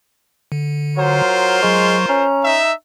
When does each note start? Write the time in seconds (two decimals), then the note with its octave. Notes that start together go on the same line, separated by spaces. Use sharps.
0.52 D3
0.97 F#3 F4 A#4 C5
1.63 F#3 G#3 C#6
2.09 C#4 A#5
2.44 D#4 E5